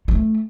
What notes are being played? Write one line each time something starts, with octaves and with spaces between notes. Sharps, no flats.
A3